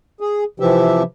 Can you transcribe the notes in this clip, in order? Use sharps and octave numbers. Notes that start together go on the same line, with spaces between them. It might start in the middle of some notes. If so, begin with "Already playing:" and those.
G#4
C3 E3 F3 G4 E5